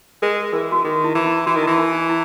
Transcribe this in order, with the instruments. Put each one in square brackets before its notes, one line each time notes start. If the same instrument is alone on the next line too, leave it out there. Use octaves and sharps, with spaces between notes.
[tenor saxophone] G#3 [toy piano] A#4
[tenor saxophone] E3 [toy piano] A#4
[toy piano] F#4
[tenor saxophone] D#3 [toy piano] G#4
[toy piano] E4
[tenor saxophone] E3
[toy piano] E4
[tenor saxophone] E3 [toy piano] F#4
[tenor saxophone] D#3
[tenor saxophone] E3 [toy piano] E4
[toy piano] D#4
D#4
E4